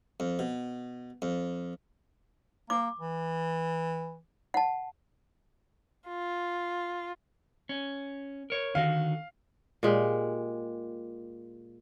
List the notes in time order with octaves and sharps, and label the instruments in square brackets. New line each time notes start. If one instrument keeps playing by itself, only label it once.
[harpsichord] F2
B2
F2
[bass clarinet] A#3 [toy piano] D6
[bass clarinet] E3
[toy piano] F#5 A5
[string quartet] F4
[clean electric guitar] C#4
A#4 C#5
[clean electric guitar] D3 D#3 F#4 [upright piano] F5
[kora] A#2 G#3 G4